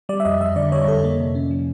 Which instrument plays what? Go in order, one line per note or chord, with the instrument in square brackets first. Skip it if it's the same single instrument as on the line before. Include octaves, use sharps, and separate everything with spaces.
[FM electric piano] G3 D5
E5
F2 D#5
F2 E5
D3 D5
G3 C#5
F2 A4
A#3
C3
C#4
F3